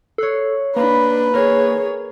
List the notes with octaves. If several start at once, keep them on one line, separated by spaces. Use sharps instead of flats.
A4 C#5 F#6 C7
A#3 D4 B4 A#5 B5
G#4 A#4 C#5